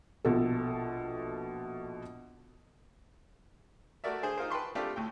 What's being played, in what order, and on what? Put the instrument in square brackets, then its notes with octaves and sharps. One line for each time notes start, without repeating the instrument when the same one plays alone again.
[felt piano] A#1 B2 A4
[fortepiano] A3 F#4 A#4 D5 E5
D3 G#4 C5
D#4 F4 A#4 C5
B4 G5 A5 C6 C#6
A3 C4 D4 F4 G4 A4
D2 A2 G5